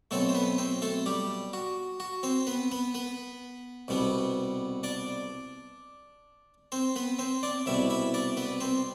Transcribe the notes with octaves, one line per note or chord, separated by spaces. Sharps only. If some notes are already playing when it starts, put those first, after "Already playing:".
B2 F#3 A3 C4 A4
C5
B3 B4
C4 C5
A3 A4
G3 G4
F#4
F#4
C4 C5
B3 B4
B3 B4
B3 B4
C2 B2 G3 B3
D4 D5
C4 C5
B3 B4
C4 C5
D4 D5
C2 B2 G3 E4 E5
E4 E5
D4 D5
B3 B4
C4 C5